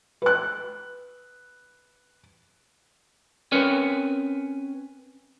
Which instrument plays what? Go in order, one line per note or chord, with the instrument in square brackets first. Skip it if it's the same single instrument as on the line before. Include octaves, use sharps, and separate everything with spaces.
[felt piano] B4 F#6
[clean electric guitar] C4 C#4 A#4 B4 C#5